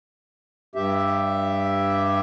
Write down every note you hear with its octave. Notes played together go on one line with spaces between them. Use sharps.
G2 G4 E5